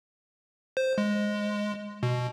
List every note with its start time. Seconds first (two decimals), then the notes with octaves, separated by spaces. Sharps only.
0.77 C5
0.98 G#3
2.03 B2